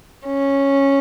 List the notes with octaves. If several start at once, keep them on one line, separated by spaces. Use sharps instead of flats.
C#4